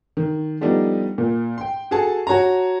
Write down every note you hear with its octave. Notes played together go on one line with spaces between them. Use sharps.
D#3
F3 G3 A3 B3 D4 D#4
A#2
G5 C6
F#4 G#4 A4 A5
F#4 C#5 A5 A#5